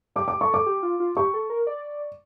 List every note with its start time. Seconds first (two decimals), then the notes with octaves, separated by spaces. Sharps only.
0.16 G4 D6
0.28 D6
0.41 A4 C#6
0.54 D6
0.66 G4
0.83 F4
1.00 F4
1.17 G4 C#6
1.34 A4
1.50 A#4
1.67 D5